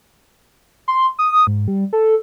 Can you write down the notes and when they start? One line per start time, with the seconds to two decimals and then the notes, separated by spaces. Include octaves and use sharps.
0.88 C6
1.19 D#6
1.47 G#2
1.68 G3
1.93 A4